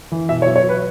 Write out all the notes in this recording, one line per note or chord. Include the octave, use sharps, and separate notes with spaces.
E3
B2 E5
C#5
F#3
C#5
F#3
B4